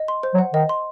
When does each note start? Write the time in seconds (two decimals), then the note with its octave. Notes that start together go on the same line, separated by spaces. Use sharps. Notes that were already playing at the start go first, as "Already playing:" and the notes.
Already playing: D#5
0.08 C6
0.23 C5
0.34 F#3
0.38 F#5
0.54 D#3 D#5
0.69 C6